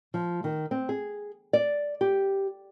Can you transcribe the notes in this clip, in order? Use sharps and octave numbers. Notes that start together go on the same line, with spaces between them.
F3
D#3
C4
G#4
D5
G4